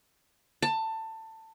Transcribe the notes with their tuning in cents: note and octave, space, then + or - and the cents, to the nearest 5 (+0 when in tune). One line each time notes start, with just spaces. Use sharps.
A5 +20